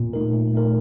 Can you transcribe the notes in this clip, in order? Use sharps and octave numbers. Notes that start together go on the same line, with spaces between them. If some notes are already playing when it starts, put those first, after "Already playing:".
Already playing: A#2
A3 D#4 A#4
A#2
A3 D#4 A#4